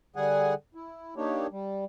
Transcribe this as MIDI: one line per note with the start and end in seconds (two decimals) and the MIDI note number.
0.16 0.54 50
0.16 0.54 55
0.16 0.54 68
0.16 0.54 78
0.16 0.54 80
0.75 1.14 64
1.16 1.47 58
1.16 1.47 62
1.16 1.47 63
1.16 1.47 67
1.16 1.47 73
1.51 1.85 55